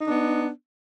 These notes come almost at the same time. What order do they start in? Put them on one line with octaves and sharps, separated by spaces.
D#4 D4 B3